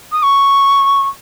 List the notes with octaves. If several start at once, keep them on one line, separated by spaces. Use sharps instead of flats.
D#6
C#6